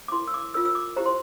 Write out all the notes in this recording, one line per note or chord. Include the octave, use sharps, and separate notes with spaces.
D6
E4 A#4 C6
E6
D6
F4 A#4 E6
E6
D6
E4 G4 C5 A#5
C6